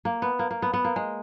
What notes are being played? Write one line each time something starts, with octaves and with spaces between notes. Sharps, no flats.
A#3
B3
A#3
A#3
B3
B3
A#3
G#3